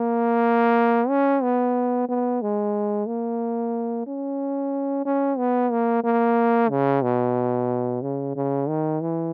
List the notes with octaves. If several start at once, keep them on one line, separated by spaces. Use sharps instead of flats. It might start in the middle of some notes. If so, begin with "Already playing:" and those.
Already playing: A#3
C#4
B3
B3
G#3
A#3
C#4
C#4
B3
A#3
A#3
C#3
B2
C#3
C#3
D#3
E3